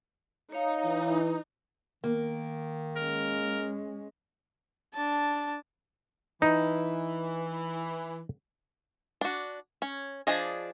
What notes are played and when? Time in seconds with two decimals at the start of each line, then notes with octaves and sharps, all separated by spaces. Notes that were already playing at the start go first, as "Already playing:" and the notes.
0.52 D#4 C#5 F5
0.84 E3
2.04 D#3 A#3
2.96 G#3 C#4 A#4
4.94 D4 A5
6.42 E3 D#4
9.21 D4 F#4
9.82 C#4
10.27 F3 D4 G#4 D#5